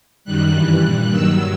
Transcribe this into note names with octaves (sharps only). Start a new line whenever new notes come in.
F#2 D#3 G3 F#6
G2 E3 G3
A#2 G3 F#6
G2 D#3 F#3 E6